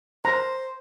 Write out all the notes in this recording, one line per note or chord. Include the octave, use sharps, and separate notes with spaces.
C5 A#5